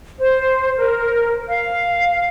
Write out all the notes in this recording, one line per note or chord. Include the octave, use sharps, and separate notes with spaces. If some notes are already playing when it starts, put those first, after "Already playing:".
C5
A#4
F5